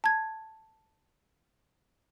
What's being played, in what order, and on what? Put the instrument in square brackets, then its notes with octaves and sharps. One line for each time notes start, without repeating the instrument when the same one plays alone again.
[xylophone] A5 G#6